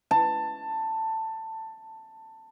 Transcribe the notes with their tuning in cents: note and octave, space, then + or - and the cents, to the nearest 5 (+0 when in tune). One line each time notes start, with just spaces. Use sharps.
A5 +15